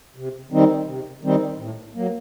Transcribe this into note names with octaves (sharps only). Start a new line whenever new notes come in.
C3
D#3 G3 C4 D#4
C3
D#3 G3 C4 D#4
A2
F#3 A#3